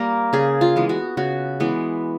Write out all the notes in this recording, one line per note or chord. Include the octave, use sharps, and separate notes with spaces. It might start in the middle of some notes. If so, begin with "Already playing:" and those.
Already playing: G3 A#3 A#4
C#3 G#4
F4
E3 G#3 B3
F#4
C#3 F#4
E3 G#3 B3